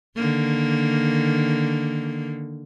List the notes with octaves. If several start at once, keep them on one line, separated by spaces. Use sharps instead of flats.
D3 D#3 A#3